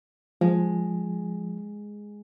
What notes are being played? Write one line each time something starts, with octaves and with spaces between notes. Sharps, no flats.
F3 G#3